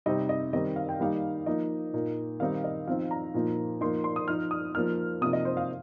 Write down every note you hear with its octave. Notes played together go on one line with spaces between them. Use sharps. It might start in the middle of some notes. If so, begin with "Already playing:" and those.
C3 G3 C4 D#4 D#5
D#5
D#3 G3 C4 D#4 D#5
F5
G5
D#3 G3 A#3 D#4 F5
F3 A#3 D#4 D#5
A#2 A#3 D#4
D#3 G3 C4 D#4 F5
D#5
F3 C4 D#4 F5
A#5
A#2 F3 A#3 D#4
F3 A#3 D#4 C6
C6
D#6
F3 D#4 F6
D#6
F3 A#3 D#4 F6
C3 F3 A#3 D#4 D#6
D#5
C5
F5